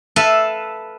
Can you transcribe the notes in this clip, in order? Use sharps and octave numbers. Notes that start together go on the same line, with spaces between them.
A4 B4 E5 F5